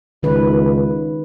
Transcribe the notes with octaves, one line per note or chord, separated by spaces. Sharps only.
C#2 D#3 B4